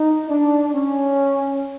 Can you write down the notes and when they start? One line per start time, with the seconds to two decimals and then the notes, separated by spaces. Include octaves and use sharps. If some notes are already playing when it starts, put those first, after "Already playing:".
Already playing: D#4
0.30 D4
0.74 C#4